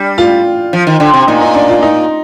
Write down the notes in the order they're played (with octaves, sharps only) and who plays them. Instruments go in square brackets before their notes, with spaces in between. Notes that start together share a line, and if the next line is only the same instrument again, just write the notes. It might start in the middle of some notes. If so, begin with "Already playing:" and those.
Already playing: [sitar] G3 [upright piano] D4
[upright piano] F4
[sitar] F3
D#3
D3
C3
[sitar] A#2 [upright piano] D#4
[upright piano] D#4
D4
F4
D#4